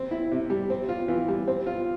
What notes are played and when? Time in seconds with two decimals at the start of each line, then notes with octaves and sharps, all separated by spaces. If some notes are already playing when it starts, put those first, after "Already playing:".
Already playing: C4
0.11 E4
0.31 C3
0.50 G3
0.70 C4
0.89 F4
1.08 E3
1.28 G3
1.48 C4
1.67 F4